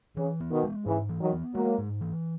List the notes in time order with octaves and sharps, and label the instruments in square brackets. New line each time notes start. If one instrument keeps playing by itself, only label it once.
[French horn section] C#3 [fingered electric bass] E3
[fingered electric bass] B3
[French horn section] B2 D#3
[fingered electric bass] G#3
[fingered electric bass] G#2 [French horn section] C#3 E3
[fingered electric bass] E3
[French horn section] D#3 F#3
[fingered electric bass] B3
[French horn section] F#3 A#3 [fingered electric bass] G#3
[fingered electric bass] G#2
E3